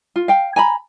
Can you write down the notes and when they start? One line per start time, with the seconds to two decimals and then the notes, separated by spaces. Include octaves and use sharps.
0.16 F4
0.28 F5 G5
0.56 G#5 A#5 B5